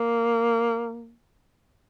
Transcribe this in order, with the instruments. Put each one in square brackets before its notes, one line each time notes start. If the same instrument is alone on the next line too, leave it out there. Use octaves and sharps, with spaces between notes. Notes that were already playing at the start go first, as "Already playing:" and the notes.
Already playing: [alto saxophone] A#3